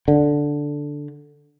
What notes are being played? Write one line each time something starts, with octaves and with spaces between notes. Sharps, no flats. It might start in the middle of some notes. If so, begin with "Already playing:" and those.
D3